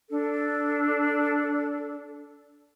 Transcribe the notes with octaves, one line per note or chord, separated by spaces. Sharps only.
D4 A4